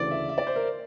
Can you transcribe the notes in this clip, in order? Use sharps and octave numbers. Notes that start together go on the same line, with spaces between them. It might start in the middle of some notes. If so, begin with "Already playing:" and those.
Already playing: D2 C#3 E3 D5
E5
E5
D5
C5
A#4